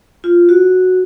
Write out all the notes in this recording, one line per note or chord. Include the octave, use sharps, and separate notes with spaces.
F4
F#4